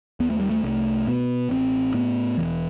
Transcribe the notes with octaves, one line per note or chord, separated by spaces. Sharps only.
D#2 B3
A3
G3
A3
C2 A3
B2 B3
A1 C4
A2 B3
E1 E3